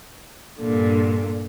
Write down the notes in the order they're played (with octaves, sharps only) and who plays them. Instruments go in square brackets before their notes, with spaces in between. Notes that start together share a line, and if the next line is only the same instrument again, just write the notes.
[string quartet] G2 A#2 D3